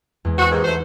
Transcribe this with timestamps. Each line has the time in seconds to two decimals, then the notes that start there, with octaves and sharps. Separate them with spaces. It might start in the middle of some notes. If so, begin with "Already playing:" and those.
0.25 E2 G#3
0.39 C4 F#4
0.51 D#2 G#2 D#4
0.64 F#3 A3 C5